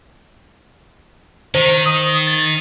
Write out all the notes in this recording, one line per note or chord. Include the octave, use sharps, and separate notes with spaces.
D#3 C5
D#6
A6